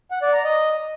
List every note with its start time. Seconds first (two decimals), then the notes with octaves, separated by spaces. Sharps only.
0.11 F#5
0.22 D5
0.33 A#5
0.44 D#5